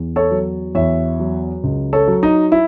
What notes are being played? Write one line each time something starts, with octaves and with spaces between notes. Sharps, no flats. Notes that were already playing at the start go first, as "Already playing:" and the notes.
Already playing: E2
A4 C#5
F#3
E2 C#5 E5
F#3
C#2
A4 C#5
F#3
D#4
E4